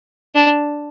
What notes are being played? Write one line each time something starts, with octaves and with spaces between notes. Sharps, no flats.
D4